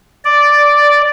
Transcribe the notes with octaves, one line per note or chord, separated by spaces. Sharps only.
D5